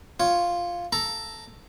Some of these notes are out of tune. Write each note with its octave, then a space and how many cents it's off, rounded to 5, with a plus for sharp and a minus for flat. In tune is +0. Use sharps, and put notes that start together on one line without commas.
F4 +0 C#5 +0
A4 +0 A#5 +0